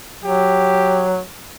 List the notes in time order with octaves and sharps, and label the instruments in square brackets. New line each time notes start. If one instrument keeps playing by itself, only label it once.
[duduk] F#3 [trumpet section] G4